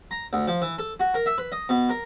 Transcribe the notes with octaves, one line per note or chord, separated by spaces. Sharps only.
A#5
D2
F3
E3
A4
F#4
A#4
E5
B4
D#5
B2
A#4